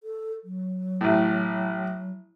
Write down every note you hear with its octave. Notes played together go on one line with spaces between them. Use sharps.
A4
F#3
A1 A2